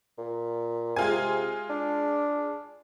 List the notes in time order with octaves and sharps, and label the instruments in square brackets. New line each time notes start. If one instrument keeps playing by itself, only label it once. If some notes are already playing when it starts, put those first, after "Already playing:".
[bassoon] A#2
[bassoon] C3 [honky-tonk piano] G#3 F4 G#5
[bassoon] D4